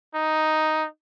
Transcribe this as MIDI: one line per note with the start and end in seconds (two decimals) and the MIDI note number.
0.15 0.86 63